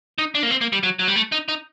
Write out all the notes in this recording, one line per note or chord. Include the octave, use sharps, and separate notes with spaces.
D#4
D4
A#3
C4
A#3
G3
F#3
F#3
G3
A3
D#4
D#4